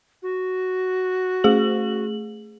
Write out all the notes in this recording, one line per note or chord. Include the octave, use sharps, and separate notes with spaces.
F#4
A3 G#4 F#7